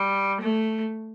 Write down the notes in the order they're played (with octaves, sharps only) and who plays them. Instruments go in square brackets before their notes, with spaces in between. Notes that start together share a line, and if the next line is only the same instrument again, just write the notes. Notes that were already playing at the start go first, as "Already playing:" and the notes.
Already playing: [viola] G3
A3